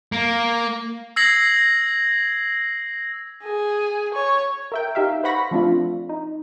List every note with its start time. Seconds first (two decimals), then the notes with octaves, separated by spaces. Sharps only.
0.12 A#3
1.16 E6 G#6 A#6 C7 F#7
3.44 G#4
4.14 C#5
4.72 A#4 E5 G5
4.95 D#4 G4 E5 F5
5.23 B4 C5 F#5 B5 C#6 A#6
5.51 F3 A3 C4 D4 F4
6.09 D#4